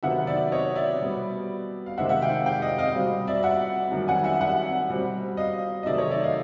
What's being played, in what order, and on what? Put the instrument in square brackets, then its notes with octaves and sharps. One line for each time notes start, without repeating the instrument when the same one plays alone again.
[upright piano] C3 D#3 F#3 B3 E5 F#5
D5 E5
C#5 D#5
D5 E5
B2 G3 B3
F5
C3 D#3 G#3 C4 E5 F#5
E5 F#5
F5 G5
F5 G5
D#5 F5
D#5 F5
B2 G3 C4
D5 E5
E5 F#5
F#2 D#3 G3
F#5 G#5
E5 F#5
E5 F#5
B2 G3 C4
D#5 F5
D#5
C3 D#3 F#3 A3 C4 D5 E5
C#5 D#5
D5 E5
D#5 F5